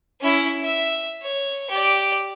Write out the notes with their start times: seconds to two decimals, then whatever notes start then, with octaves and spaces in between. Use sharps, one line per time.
0.21 C#4 E4
0.63 E5
1.22 C#5
1.70 G4 D5